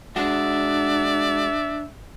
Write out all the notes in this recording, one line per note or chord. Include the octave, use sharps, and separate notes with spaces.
G#3 D4 F#4 D5 E5